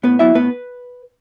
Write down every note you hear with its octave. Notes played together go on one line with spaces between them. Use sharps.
A2 B3 B4
F#3 B3 E4 E5
A2 B3 B4